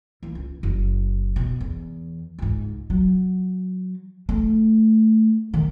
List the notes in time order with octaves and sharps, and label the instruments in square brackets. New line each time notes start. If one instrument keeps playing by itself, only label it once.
[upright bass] E3 A#3
C#2
F#1
B2
E2
C#2 G#2
F#3
A3
D#3